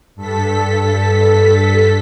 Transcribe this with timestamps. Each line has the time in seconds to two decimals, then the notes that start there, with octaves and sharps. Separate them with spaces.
0.16 G2 A4 B6